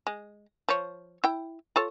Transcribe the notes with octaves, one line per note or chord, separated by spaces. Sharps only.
G#3
F3 C#5
E4 G5
F4 A4 C#5